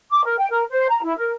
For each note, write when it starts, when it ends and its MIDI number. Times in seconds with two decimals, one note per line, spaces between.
0.11 0.22 86
0.24 0.36 70
0.38 0.46 79
0.51 0.63 70
0.70 0.85 72
0.89 0.99 82
1.02 1.14 64
1.17 1.33 70